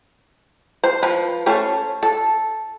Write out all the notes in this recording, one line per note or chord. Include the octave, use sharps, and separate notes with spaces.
C5
F3 B4
A3 C#4 A4 C5
A4